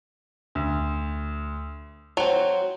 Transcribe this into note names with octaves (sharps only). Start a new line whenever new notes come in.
D2
F#3 C4 F7